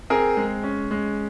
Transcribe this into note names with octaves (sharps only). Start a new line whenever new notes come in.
C4 G#4 A#4
G#3
C#4
G#3